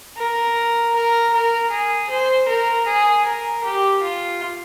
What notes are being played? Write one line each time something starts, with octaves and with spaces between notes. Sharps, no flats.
A#4
A#4
A#4
G#4
C5
A#4
G#4
A#4
G4
F4